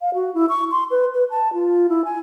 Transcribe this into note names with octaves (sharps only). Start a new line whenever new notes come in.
F5
F#4
E4
C#6
C6
B4
B4
A5
F4
E4
G#5